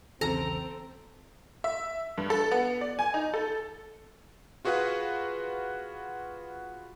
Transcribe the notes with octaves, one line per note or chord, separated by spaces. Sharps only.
B1 E2 C#3 C4 A4 A#5
E5
G2
A4
B3
D5
G#5
D#4
A4
F4 F#4 G#4 B4 F5 F#5